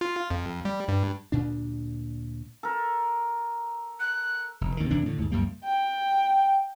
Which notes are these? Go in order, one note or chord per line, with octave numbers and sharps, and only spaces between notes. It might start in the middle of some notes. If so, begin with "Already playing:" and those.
F4
F2
G3
G2
D2 A#2 D4
A4 A#4
F#6
F1 B2
D#2 D#3
E2 C3 E3 D4
A2 D3
D#2 G#2
C#2 F#2 G3 A#3
G5